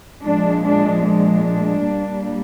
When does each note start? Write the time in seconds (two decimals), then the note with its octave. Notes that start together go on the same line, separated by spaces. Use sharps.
0.22 A#2 F3 G#3 D4
0.63 D4
1.04 D4
1.85 A#2 G3 A#3